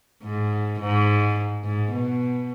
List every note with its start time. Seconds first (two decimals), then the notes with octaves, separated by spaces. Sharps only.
0.23 G#2
0.80 G#2
1.64 G#2
1.92 B2